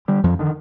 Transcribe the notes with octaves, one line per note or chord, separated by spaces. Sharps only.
D3 G3
F2 F3
D3 D#3